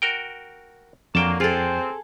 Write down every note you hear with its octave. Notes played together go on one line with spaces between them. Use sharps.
F#4 A#4 G5
F2 D3 F#3 A#3 G5 A5
A#3 C4 F4 G#4 A4 D5